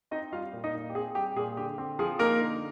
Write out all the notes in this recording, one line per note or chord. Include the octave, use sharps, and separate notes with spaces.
C4 D#4 D#5
G3 F4 F5
A#2
D#4 D#5
A#2
G4
C4 G#4
G3 G4
A#2 G#4
D3 G4
C4
F3 G#4
A#3 D#4 A#4
D3